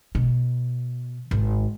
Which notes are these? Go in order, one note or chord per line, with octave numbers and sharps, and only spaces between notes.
B2
G#1